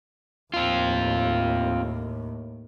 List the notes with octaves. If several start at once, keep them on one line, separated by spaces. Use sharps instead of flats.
D#2 A2 C4 F4